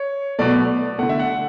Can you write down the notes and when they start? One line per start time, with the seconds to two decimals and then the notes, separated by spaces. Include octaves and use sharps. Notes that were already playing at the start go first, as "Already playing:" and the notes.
Already playing: C#5
0.39 B2 F#3 A3 D5
0.99 D3 A3 F#5
1.09 E5
1.19 F#5